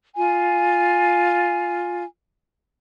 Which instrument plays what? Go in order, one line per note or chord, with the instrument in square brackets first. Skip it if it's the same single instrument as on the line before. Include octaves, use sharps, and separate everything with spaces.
[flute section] F4 G#5